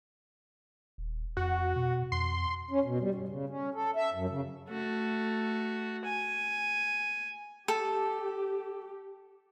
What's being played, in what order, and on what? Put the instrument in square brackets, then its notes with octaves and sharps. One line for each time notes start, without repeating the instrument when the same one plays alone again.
[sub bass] D#1
[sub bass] F2 [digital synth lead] F#4
[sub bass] B2
[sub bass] F2 [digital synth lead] C6
[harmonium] C#4
B2
G3
G2
C#3
C#4
A4
E5
F#2
C#3
[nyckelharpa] A3 F#4
G#5
[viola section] G4 [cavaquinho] A4